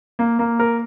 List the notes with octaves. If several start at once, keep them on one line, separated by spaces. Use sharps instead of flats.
A#3
A#3
A#4